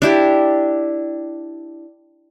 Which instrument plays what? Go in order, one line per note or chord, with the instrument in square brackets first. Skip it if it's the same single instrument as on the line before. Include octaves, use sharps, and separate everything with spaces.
[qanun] D4 E4 G4